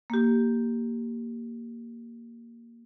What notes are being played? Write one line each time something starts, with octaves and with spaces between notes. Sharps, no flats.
A#3 G4